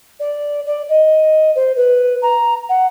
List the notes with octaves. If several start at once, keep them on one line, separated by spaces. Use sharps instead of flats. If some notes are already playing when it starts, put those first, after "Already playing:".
D5
D5
D#5
C5
B4
A#5
F#5